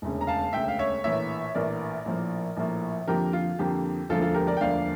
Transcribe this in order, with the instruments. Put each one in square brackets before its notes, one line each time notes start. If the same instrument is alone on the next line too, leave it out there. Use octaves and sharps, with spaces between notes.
[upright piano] E1 D2 C#3
A#5
F5 A5
E1 D2 C#3 E5 G5
F5
C#5 E5
A#1 A2 E3 A#3 C#5 E5
A#1 A2 E3 A#3 A#4 D5
A#1 A2 F3 A#3
A#1 A2 F3 A#3
F2 D3 F3 A#3 G4 A#4
F4
F2 D3 F3 A#3 G4
E1 D2 D3 F3 A#3 F4 A4
F4 A4
G4 A#4
A#4 D5
G5
E1 D2 D3 F3 A#3 D5 F5